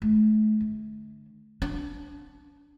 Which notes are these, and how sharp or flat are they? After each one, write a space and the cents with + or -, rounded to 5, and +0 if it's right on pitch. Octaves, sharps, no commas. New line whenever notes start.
A3 -35
D3 +15
D4 -20